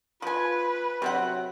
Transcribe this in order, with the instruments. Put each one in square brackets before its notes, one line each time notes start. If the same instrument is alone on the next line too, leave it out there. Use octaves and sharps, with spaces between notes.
[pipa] F3 G#5 [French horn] F4 [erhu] B4
[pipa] C3 C4 F#5 [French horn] F#3